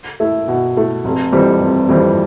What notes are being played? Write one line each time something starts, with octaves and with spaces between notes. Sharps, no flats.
A3 E4
B2
A3 E4
F1
F2 E3 G3 C4
F1
F2 E3 G3 C4